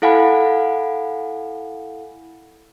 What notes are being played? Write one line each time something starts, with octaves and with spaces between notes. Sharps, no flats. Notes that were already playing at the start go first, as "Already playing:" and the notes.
E4 A4 F5 F#5 G#5 B5